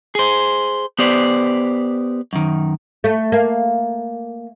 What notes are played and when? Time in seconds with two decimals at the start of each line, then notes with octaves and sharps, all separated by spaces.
0.15 G#4 C5
0.99 B3 G4 C5 D5
2.33 F#2 D#3
3.04 A3
3.32 A#3